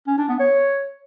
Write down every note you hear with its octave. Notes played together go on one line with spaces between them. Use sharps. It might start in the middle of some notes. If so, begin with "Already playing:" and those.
C#4
D4
B3
C#5